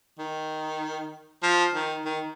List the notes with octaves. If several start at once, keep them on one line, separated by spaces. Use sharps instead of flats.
D#3
F3
D#3
D#3